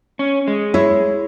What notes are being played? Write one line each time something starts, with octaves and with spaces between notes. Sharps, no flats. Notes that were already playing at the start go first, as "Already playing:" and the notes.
C#4
G#3
E4 C#5